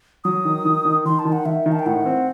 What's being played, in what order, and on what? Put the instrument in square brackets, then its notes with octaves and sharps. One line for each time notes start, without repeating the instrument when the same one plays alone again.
[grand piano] F#3 [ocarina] D#6
[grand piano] D#3
D#3
D#3
[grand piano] D#3 [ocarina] C6
[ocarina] A5
[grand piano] D#3
[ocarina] F#5
[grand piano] D#3 [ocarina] E5
[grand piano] D#3
[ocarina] A5
G5
[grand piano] A2 [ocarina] F#5
[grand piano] C4